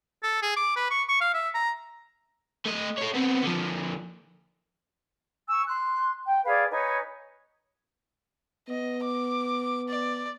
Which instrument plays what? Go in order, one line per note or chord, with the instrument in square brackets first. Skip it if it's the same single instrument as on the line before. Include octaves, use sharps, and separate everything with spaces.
[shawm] A4
G#4
D6
B4
C#6
C#6
F5
E5
A#5
[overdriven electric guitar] A3 D#5
A4 C#5
B3 C4
D3 F3
[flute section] G#5 C#6 E6
C6 F#6
G5
G#4 B4 D5 F5
D#4 B4 C#5 G#5
[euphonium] B3 [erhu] D#5
[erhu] D6
D5